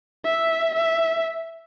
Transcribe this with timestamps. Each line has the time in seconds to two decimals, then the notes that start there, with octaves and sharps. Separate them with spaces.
0.25 E5
0.75 E5